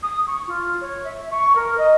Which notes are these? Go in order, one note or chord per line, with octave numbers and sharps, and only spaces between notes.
D#6
C#6
F4
C#5
E5
C#6
A#4
D#5